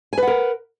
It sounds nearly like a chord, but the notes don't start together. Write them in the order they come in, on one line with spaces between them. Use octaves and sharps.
G#5 B4 F#5 A#4